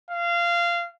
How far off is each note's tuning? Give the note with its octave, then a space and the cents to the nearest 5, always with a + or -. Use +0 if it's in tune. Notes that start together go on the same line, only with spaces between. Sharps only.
F5 -20